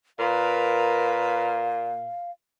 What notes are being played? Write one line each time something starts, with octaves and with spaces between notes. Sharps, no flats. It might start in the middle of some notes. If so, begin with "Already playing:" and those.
A#2 A#4 B4 F5